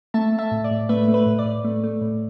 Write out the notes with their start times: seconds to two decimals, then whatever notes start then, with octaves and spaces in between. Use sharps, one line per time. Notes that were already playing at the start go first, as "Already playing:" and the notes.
0.14 A3 E5 A5
0.32 A3
0.38 E5 A5
0.52 A2
0.64 D5
0.71 A2
0.89 A3 B4 E5
1.08 A3
1.14 B4
1.26 A2
1.39 D5
1.45 A2
1.64 A3
1.83 A3
2.01 A2